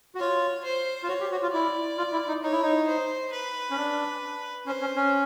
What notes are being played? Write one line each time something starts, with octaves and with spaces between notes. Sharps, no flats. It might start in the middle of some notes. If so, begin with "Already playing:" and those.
F#4
F4 C#5
C5
F4
F#4 C#5
G4
F#4
F4
E4 D5
F4
E4
D#4
D#4 C#5
E4
D#4
C5
B4
C#4
D4
C#4 C5
C#4
C#4